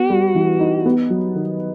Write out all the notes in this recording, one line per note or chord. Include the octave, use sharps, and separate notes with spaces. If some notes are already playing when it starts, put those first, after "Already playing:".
Already playing: B3 F#4
G3
E3
D#4
B3
F#3
D#3